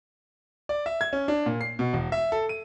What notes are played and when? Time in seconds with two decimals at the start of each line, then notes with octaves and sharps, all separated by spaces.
0.69 D5
0.86 E5
1.01 G#6
1.13 C#4
1.28 D4
1.46 A#2
1.61 C7
1.79 B2
1.93 E1
2.12 E5
2.32 A4
2.49 D#7